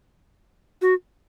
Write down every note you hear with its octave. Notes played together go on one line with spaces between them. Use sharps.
F#4